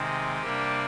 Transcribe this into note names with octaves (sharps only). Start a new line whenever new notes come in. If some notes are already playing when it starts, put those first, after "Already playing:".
Already playing: C3 D#3 G#3 C4
C3 G3 A#3 D4 G4